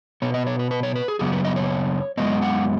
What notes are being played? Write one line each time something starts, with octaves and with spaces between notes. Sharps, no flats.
B2 B3 C#5
D#5
C#5
B4
B4
C#5
B4
G#4
F#2 C#3 F#3 B3 G#4
B4
D#5
C#5
F#2 C#3 G#3 B3 D#5
F#5